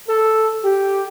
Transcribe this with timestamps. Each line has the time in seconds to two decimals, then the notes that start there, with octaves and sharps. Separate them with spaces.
0.09 A4
0.65 G4